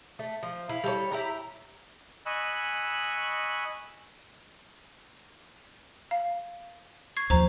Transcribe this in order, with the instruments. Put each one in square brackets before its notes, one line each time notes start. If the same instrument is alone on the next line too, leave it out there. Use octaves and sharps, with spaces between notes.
[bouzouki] A3
F3
E4 F5
G3 A4 A#4 C#5
E4 G4 A#5
[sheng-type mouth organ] D#5 G#5 B5 C#6 E6 F#6
[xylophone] F5
C#6 G#6 C7
[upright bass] D#2 F3 [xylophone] C5 A#5